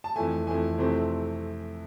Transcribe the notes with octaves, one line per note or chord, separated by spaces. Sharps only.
A5
F2 E3 A3 G#5
F2 E3 A3 G#5
F2 C3 E3 A3 C4